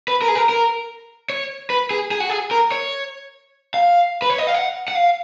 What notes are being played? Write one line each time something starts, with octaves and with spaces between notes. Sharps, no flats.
B4
A#4
G#4
A#4
A#4
C#5
B4
G#4
G#4
F#4
G#4
A#4
C#5
F5
B4
C#5
D#5
F5
F#5
F#5
F5